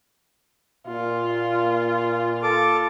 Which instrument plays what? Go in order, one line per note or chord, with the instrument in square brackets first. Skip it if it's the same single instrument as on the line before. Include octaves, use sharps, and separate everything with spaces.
[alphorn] A#2 [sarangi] F4
[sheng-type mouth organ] A4 D6